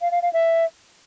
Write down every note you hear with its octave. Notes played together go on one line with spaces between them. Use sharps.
F5
F5
F5
E5